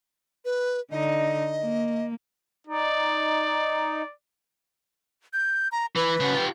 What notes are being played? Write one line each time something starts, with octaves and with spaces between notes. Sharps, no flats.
B4
D3 D#4 D#5
A#3
D#4 D5
G6
A#5
E3 B4
C#3 F#4
F4 G4